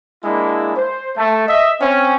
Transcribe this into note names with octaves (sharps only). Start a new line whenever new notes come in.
G#3 A#3 D4 E4
C5
A3
D#5 E5
C4 C#4